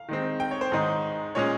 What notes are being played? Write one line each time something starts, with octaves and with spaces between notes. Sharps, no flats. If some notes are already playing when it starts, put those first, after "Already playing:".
Already playing: F5
D#3 G#3 C4
G5
C#5
C5
G#2 D#3 G#3 D#4
A#2 G#3 C#4 C#5